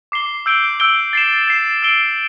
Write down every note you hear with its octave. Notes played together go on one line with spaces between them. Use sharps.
D6 C7 G7
E6 G6 D7 G7
E6 G6 D7 G7
A6 C7 E7
A6 C7 E7
E6 A6 D7 G7